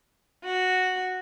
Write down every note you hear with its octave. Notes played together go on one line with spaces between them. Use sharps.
F#4